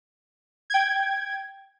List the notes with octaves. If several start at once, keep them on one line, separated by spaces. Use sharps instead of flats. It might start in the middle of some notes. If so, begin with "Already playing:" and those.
G5 G#6